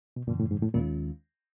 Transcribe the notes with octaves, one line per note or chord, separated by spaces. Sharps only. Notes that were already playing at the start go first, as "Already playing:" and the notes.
B2
F#2 A#2 C#3 E3
A2
G#2
A2
D#2 A#2 D#3 G#3 C#4 F4